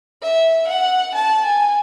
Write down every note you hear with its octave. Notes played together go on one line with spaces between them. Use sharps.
E5
F#5
A5
G#5